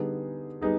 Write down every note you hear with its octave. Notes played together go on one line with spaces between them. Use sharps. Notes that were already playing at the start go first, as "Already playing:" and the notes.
Already playing: D3 G3 B3 D#4 G#4
G3 B3 D#4 G#4